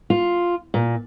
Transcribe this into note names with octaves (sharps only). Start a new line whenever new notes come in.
F4
A#2